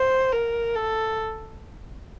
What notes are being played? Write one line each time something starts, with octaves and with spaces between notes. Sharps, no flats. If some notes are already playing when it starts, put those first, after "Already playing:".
Already playing: C5
A#4
A4